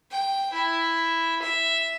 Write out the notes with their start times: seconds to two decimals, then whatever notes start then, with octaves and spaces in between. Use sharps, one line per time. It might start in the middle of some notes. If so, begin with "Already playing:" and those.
0.11 G5
0.53 E4
1.42 E5